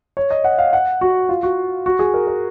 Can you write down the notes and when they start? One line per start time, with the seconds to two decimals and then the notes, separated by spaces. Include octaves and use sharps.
0.17 C#5
0.31 D#5
0.44 F#5
0.58 F5
0.73 F#5
1.01 F#4
1.29 F4
1.43 F#4
1.86 F#4
1.99 G#4
2.14 A#4
2.27 A#4